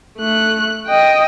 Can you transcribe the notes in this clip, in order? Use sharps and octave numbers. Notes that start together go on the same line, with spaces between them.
A3 F#6
D#5 G5